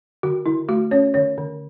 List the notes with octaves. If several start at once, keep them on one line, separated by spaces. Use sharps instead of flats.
D3 F#4
D3 E4
A3 F#4
C#4 C#5
D3 C#5
D3